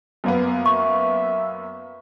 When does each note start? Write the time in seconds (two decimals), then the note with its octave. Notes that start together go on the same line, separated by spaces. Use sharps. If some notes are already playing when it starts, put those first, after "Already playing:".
0.24 F#2 A#3 B3
0.66 E5 C#6